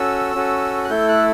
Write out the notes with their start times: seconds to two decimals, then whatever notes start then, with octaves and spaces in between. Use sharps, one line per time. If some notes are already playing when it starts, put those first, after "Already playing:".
Already playing: C#4 F#4 A4 E6
0.35 C#4 F#4 A4
0.84 F#6
0.90 A3 E4 A4 G6
1.09 F#6